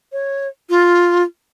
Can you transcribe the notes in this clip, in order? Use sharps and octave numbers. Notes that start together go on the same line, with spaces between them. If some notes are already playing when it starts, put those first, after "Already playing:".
C#5
F4